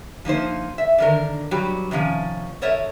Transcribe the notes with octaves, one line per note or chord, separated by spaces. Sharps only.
F3 A#3 D#4 C5
E5
D3 D#3 A#4
G2 F#3 G3 F#4 G4
C3 D#3 F3 C#4
A4 A#4 C#5 D#5 E5